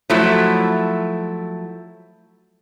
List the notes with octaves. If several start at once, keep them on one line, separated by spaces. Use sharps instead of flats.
F3 F#3 A3 E4